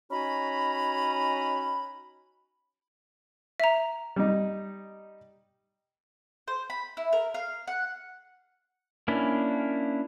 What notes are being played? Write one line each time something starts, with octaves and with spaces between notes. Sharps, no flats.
C#4 D#4 F#4 G#5 A#5 B5
E5 A#5
G3 D#4
C5
B5
E4
A#4
F5
F#5
A#3 C#4 D4 E4